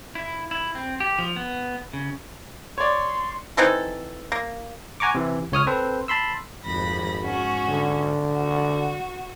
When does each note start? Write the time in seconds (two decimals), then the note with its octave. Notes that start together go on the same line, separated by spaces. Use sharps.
0.15 E4
0.51 E4
0.75 C4
1.00 G4
1.19 F3
1.36 B3
1.93 C#3
2.78 C#5 D5 C6
3.57 E3 C4 D#4 A4
4.32 A#3
5.00 F#5 G#5 A#5 C#6 D6
5.15 C3 E3
5.52 C#2 C#5 D#6 F6
5.67 C4 A4 B4 C5
6.08 A5 B5 C6 E6
6.64 G#1 F2 B5 A#6
7.24 G#2 C#4 F#4
7.70 D3
8.31 F#4